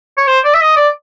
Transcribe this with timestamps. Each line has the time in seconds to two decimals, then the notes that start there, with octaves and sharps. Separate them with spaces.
0.17 C#5
0.28 C5
0.45 D5
0.54 E5
0.61 D#5
0.77 D5